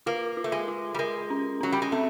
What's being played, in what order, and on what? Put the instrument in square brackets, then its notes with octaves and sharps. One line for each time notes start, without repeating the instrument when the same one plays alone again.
[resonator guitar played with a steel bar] A#3 [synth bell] F4
[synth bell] F4
[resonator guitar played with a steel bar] A3
G#3
[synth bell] F4
[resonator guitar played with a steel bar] G3
[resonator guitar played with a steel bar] G#3 [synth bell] A#4
[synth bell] C#4
[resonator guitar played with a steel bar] F#3 [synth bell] C#4
[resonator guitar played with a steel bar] G3
G#3
[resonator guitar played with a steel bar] A3 [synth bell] C4